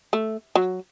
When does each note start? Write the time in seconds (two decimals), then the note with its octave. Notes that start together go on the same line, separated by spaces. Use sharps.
0.13 A3
0.55 F#3